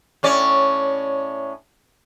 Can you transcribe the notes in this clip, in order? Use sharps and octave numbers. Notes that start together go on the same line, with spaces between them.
A2 C#4 D5